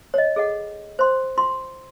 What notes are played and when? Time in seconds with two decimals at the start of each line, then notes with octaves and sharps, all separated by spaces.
0.14 C#5 D#5
0.36 G#4 A4 D#5 F#5
0.99 C5 C6
1.37 F4 C6